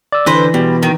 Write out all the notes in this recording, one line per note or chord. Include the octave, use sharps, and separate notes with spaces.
D5 E6
D3 E3 B4 C5 A#6
B2 G3
D#3